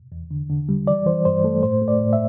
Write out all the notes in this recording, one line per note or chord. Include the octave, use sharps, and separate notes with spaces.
E2
D3
D3
G3
E3 D5
E3 C5
G2 C5
A3 A4
A2 C5
A3
D5
A2
E5